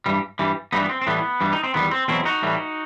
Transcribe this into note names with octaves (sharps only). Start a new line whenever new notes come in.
G2 E3 G3
G2 E3 G3
G2 E3 G3 B3 D#4
B3
C4
C4
A2 E3 G3 B3
G2 E3 G3
D#4
C4
E2 D#3 G3 B3
C4
E2 B2 F#3 C4 E4
D#4 F#4
A2 E3 G3